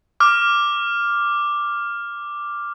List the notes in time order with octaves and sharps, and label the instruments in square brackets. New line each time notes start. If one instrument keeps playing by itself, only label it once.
[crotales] D6 F6